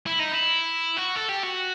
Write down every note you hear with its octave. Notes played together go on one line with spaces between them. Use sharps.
E4
D#4
E4
F#4
A4
G4
F#4